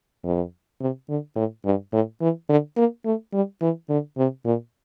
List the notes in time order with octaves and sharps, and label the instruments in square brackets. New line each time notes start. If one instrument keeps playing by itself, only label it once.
[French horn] F2
C3
D3
A2
G2
A2
E3
D3
A#3
A3
G3
E3
D3
C3
A#2